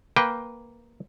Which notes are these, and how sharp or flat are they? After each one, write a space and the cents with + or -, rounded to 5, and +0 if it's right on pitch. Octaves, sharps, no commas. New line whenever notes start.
A#3 +0 B4 +0 G5 +0